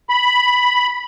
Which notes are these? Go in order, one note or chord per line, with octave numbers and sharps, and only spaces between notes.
B5